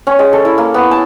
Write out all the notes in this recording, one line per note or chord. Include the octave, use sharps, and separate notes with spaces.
C#4
G#3
A4
E4
A#3
B3
A5